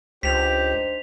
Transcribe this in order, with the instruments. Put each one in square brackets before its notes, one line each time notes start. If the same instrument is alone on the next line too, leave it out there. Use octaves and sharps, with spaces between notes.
[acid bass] C#2 [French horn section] D4 D#4 C5 [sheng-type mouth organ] G4 [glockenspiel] B6 F7